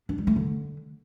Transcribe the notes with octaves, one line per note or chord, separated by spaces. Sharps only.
D4
G3
A3
D3